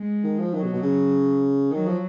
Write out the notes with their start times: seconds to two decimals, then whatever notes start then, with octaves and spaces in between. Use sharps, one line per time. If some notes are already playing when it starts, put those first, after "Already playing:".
Already playing: G#3
0.24 D#3
0.39 F3
0.53 D#3 F#3
0.63 B2
0.73 B2
0.83 C#3
1.72 D#3 F#3
1.87 F3